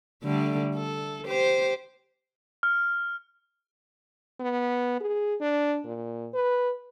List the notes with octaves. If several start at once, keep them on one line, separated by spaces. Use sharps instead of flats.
D3 G3 A3
A4
G4 C5
F6
B3
G#4
D4
A#2
B4